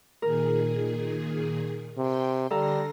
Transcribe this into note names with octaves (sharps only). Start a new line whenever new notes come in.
A#2 D#3 G#4 A#4
C3 G5 C6
D3 G3 A4 F5 A#5 C6 A#6